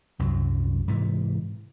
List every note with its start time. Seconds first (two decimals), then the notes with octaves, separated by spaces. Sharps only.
0.19 C2 F#2 F#3
0.88 G#2 C3 E3